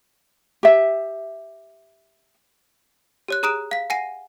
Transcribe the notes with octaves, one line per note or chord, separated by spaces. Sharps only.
G4 E5
G4 C#5 F#6
G#4 A#5 D#6 F#6 D7 E7
F5 B6
F#5 G#5 A#6 C7 D#7